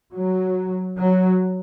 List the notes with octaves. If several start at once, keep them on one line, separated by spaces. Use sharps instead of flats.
F#3
F#3